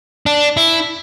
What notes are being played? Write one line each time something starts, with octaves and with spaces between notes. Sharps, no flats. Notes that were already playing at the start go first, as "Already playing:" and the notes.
D4
E4